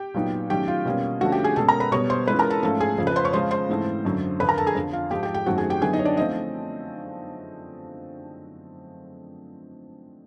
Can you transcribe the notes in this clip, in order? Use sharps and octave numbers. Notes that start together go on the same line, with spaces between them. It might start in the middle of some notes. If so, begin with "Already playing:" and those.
Already playing: G4 G5
A#2 F#3 B3 D#4
D#3 F#3 A3 C#4 G4 G5
F4 F5
B2 G3 A#3 C#4 F4
D3 F3 A3 C#4 F#4 F#5
G4 G5
G#4 G#5
B2 G#3 C#4 A4 A5
A#4 A#5
B4 B5
B2 G3 B3 C#5 C#6
C5 C6
E3 G#3 C#4 F4 B4 B5
A#4 A#5
A4 A5
G#2 F3 A3 C#4 F4 A4 A5
G#4 G#5
F2 C#3 F3
B4 B5
C5 C6
C#5 C#6
C#3 F3 G#3 C#4 F4 C5 C6
C5 C6
G#2 E3 A3 C4
F#2 D3 F#3
F2 D3 F3 B4 B5
A#4 A#5
A4 A5
G#4 G#5
F2 D3 F3
F4 F5
G#2 F3 G#3 G4 G5
G4 G5
G4 G5
F#2 D#3 F#3 A3 C4 F#4 F#5
G#4 G#5
G4 G5
D3 F#3 B3 E4 G#4 G#5
D#4 D#5
C#5
D4 D5
F3 A3 C4 D#4 D#5